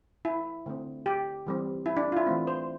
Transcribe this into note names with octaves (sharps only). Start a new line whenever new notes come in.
E4
D3 A3 C4
G4
E3 G3 C4
E4
D4
F4
E4
E3 A3 C4
C5